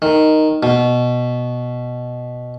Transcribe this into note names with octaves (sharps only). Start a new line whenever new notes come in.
D#3
B2